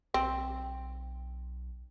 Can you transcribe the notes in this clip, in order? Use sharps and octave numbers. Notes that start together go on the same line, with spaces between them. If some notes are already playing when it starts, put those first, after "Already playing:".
B1 C4